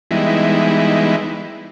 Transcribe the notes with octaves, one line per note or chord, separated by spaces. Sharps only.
E3 G3 G#3 B3 D#4 E4